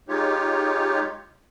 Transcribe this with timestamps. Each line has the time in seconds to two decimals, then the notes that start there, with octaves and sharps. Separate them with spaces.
0.09 G#3 D#4 F4 G4 C#5